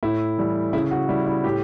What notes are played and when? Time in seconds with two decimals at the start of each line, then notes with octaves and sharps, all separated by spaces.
0.03 A2 E4
0.38 E3 G3
0.73 C#3 E4
0.91 F#4
1.09 G3 E4
1.26 E4
1.44 A2 G4